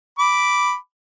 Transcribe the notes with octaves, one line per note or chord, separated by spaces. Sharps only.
B5 D6